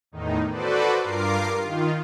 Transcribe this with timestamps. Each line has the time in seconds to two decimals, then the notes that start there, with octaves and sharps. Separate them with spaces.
0.12 E2 A2 D#3 D#4
0.50 F#4 A4 B4 C5 D5
1.00 G2 F4 A#4 D6 C7
1.58 D#3 F4